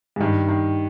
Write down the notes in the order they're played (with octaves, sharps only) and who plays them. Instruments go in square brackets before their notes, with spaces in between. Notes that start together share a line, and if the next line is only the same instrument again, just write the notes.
[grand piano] G#2
[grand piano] G2 [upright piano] D#3
[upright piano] D#3